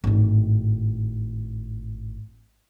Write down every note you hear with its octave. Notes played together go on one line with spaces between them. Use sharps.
G#1 A2